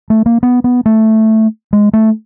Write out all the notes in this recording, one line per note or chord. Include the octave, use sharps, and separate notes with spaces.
A3
A#3
B3
B3
A3
G#3
A3